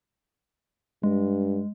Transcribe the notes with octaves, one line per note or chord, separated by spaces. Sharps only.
G2 G#3